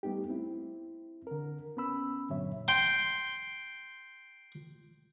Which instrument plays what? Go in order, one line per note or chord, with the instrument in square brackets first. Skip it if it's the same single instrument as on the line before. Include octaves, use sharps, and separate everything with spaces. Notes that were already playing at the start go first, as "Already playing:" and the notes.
[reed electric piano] G3 A3 B3 D#4 G4
C4 E4
D3 A#4
B3 C#4 B5 E6
G2 A#2 D3 F#3 C#5 E5
[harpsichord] G5 C6